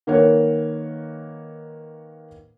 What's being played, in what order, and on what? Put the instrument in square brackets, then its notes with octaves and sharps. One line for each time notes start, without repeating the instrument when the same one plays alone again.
[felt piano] D#3 A#3 B4 C#5 F#5